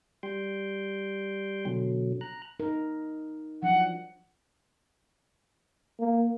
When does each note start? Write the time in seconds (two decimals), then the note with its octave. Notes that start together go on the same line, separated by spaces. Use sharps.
0.23 G3 G5 C6
1.66 B2 D3 F#3
2.21 A#5 F#6
2.60 D#4 A#4
3.63 F3 F#3 D4 F#5
6.00 A#3